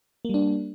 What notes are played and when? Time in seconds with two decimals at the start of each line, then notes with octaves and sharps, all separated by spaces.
0.25 A#3
0.29 G3
0.34 D4